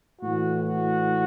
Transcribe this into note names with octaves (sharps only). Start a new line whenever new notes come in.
A2 E3 F#4
F#4